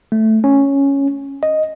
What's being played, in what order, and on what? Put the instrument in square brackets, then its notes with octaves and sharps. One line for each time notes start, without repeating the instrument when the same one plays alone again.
[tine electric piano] A3
C#4
D#5